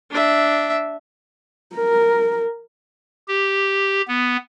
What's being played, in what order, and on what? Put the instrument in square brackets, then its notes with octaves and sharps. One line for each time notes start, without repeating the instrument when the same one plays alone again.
[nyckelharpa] D4 E5
[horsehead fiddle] A#4
[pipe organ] G4
B3